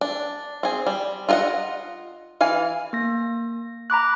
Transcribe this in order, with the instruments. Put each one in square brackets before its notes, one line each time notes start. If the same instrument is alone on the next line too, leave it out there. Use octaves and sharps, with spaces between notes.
[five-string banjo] D4
C4 G#4
G3
F4 A4 A#4 D#5 F#5
E3 F5 G#5
[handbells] A#3 A#6
A#5 B5 D6 F#6